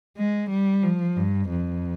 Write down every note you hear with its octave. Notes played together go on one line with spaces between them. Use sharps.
G#3
G3
F3
G2
F2